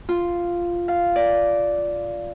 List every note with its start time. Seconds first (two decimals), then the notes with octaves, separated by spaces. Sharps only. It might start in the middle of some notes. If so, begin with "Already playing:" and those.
0.09 F4
0.88 F5
1.16 D5